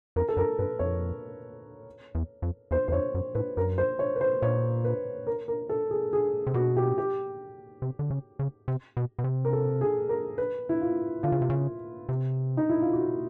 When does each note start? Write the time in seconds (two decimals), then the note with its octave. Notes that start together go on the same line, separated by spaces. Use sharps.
0.16 F2 A#4
0.29 A4
0.37 F#2 A#4
0.59 G2 B4
0.79 F2 C#5
2.15 E2
2.42 F2
2.71 E2 C5
2.88 E2 C5
2.92 F2 C#5
3.15 F#2
3.35 A2 B4
3.57 F#2 A#4
3.78 C5
3.99 C#5
4.16 B4
4.21 C5
4.42 A#2 C#5
4.85 B4
5.27 A#4
5.48 A#4
5.69 A4
5.91 G#4
6.13 G#4
6.47 C3
6.54 B2 F#4
6.77 G4
6.98 G4
7.82 C3
7.99 D3
8.10 C#3
8.39 C#3
8.68 C3
8.97 B2
9.19 B2
9.24 C3
9.45 A#4
9.53 A4
9.81 G#4
10.09 A#4
10.38 B4
10.69 E4
10.81 F4
11.23 D3 F4
11.32 C#3
11.42 C3
11.50 C#3
12.09 C3
12.57 D#4
12.70 E4
12.82 F4
12.93 F#4